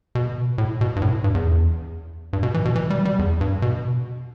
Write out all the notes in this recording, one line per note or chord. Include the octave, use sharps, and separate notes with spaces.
B2
A2
B2
G2
A2
G2
E2
G2
B2
E3
B2
E3
G3
G3
E2
G2
B2